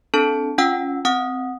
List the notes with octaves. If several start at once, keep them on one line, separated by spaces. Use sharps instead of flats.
C4 D4 A4 A5
C#4 F4 F#5 G5 E6
C4 F#5 D#6